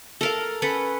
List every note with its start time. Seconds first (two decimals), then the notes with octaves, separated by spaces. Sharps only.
0.21 A4 A#4 F5
0.62 C#4 A4 B4 F#5